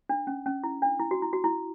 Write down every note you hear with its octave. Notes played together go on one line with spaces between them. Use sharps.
D4
C#4
C#4
E4
D4
E4
F#4
E4
F#4
E4